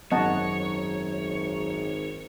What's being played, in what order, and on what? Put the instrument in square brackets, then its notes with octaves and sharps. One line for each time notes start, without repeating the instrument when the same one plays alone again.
[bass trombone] G#1 [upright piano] F#2 [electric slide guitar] C#5 [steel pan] D#5 F#5 A5